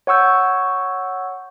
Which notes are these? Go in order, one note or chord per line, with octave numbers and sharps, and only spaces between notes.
C#5 F#5 C#6 E6 G6